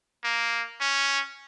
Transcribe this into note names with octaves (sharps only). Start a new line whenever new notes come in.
A#3
C#4